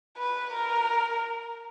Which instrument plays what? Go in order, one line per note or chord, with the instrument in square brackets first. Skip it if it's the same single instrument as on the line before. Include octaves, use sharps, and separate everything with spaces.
[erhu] B4
A#4